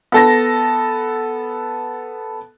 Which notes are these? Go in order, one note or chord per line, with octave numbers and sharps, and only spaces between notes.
B3 A4 A#6